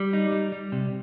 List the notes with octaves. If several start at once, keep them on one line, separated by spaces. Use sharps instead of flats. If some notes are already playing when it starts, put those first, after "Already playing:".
Already playing: G3
D#4
G3
G3
C3